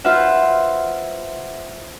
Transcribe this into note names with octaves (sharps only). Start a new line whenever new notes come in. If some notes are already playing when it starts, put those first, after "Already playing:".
F4 B4 C5 E5 F#5